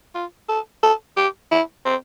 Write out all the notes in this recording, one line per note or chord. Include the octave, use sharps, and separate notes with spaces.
F4
A4
A4
G4
E4
C4